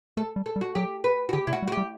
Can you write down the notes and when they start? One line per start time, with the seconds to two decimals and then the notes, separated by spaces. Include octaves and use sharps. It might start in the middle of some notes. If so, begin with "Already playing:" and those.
0.17 A3 A4
0.36 G3
0.46 A4
0.56 G3
0.61 F#4
0.75 F#3 G4
1.04 B4
1.29 F#4
1.33 D3 G4
1.47 C3 E4
1.53 F#4
1.63 G3
1.68 F#4
1.72 G4
1.77 G3